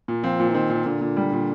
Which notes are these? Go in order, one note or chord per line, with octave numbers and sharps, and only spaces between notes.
A#2
F3 C4
A#2
E3
D#3 C4
A#2 D#3
A#2 D3
A#2
G3
A#2